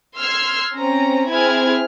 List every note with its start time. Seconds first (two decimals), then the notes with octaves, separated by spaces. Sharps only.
0.17 C6 E6 F6 G#6 C7
0.76 C4 C#4 A#5
1.31 C4 E4 G#4 G#5 F6 G#6